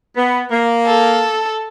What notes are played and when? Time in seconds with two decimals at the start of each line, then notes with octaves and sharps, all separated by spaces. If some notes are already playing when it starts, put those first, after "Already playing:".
0.17 B3
0.51 A#3
0.86 A4